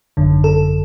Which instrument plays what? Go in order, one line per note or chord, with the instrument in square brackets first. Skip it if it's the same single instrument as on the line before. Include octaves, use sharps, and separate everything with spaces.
[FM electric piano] G#1 F#2 D3
A4